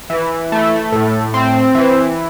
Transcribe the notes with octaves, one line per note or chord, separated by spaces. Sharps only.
E3
A3
A2
C4
E3